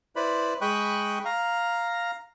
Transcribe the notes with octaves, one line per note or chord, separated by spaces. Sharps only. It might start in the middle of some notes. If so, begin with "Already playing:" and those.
E4 B4 C5 D5 B5
G#3 D#5 G5 B5 C#6 F#6
F5 A#5